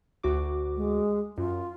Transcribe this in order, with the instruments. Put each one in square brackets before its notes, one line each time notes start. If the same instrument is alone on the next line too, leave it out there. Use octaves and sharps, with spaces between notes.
[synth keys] D2 F#4 D6
[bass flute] G#3
[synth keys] F#2 [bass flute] F4